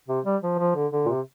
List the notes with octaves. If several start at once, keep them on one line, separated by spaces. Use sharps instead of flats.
C3
G3
F3
F3
D3
D3
A#2
C3